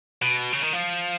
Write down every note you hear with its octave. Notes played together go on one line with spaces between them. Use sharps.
B2
C#3
D#3
F3